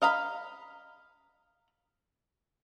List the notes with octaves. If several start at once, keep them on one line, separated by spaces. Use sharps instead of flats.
D#5 F5 A#5 B5